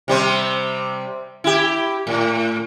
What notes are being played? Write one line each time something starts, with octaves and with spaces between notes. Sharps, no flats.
C3 G3 C4
E4 G4
A2